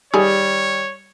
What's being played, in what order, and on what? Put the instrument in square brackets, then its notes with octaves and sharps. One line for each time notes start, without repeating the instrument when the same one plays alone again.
[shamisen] D#3 G#4 [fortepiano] G3 [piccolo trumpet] C#5